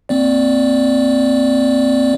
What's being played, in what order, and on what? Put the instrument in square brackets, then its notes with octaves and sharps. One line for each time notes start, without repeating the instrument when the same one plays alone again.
[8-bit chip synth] A#3 C4 D5